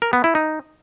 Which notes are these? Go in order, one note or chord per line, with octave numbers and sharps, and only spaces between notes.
A#4
B3
E4
D#4